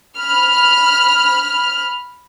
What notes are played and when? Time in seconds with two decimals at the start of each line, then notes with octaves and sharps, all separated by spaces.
0.16 B5 F6